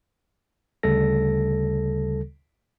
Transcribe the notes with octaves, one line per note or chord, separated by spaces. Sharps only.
D2 C#3 G3 A4 A#6